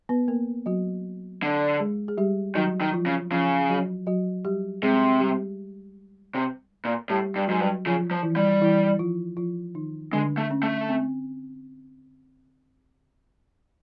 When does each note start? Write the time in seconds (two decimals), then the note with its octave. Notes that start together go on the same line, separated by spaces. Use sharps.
0.09 B3 B4
0.28 A#3 A#4
0.66 F#3 F#4
1.43 D3
1.79 G#3 G#4
2.08 G#4
2.18 G3 G4
2.55 D#3 F#3 F#4
2.81 D#3
2.93 F3 F4
3.06 C#3
3.32 C#3 F3 F4
3.69 F#3 F#4
4.06 F#3 F#4
4.45 G3 G4
4.82 C3 G#3 G#4
5.20 G3 G4
6.35 C3
6.85 A#2
7.10 A2 G3 G4
7.36 G2
7.47 G#2 F#3 F#4
7.60 G2
7.86 C#3 F3 F4
8.11 F3
8.23 E3 E4
8.36 G3
8.61 E3 E4
8.99 F3 F4
9.37 F3 F4
9.75 D#3 D#4
10.12 D3 G#3 D4
10.37 A3
10.51 C#4
10.63 A3
10.89 C4